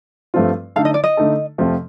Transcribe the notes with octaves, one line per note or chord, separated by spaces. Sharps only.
G2 F3 A3 C4 F4
D3 A3 D#4 A4 F5
D#5
D5
D#5
D3 A3 D#4 A4
F2 C3 F3 A3